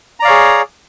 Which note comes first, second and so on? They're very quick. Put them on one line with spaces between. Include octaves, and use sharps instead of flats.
A#5 D5 F5 C#5 G#4